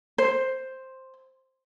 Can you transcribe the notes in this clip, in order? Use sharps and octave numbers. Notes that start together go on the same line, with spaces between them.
C5